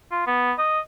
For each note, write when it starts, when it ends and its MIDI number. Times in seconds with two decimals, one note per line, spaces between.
0.12 0.24 65
0.27 0.53 59
0.58 0.80 75